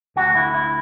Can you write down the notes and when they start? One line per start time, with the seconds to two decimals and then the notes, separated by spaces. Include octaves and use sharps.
0.16 D2 D3 F#4
0.35 E4
0.54 E4